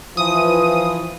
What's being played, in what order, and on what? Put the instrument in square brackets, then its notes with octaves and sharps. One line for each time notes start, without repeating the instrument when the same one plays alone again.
[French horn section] E3 F3 [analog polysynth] D#6